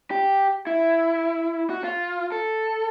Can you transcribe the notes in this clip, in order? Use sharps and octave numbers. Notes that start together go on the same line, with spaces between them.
G4
E4
F#4
F4
A4